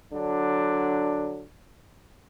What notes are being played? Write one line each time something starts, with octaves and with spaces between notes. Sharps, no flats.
D3 F#3 D4